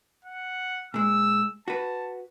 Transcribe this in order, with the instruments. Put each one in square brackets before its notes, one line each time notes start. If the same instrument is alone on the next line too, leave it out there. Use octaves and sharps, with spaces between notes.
[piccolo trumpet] F#5
[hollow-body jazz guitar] A#2 G#3 [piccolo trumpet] E6
[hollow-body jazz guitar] F#4 B4 [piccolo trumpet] A5